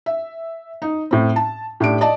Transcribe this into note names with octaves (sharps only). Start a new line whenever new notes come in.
E5
D#4
A2 C4
A5
A2 D4 G4 D7
D5 D#5 A5